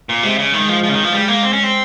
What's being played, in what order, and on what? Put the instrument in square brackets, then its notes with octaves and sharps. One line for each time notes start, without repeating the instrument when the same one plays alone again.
[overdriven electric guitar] A#2
[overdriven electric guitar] C3 [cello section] G#3
[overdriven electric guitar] C#3
[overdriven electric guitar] D#3 [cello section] G#3
[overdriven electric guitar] F3
F3
C#3
D#3
F3
[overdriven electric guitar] G3 [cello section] G#3
[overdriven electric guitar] A#3
C4
C#4
C4